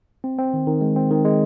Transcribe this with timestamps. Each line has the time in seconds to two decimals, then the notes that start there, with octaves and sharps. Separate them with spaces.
0.24 C4
0.38 C4
0.53 D#3
0.67 D#3
0.81 G#3
0.96 C4
1.11 D#3
1.25 G#3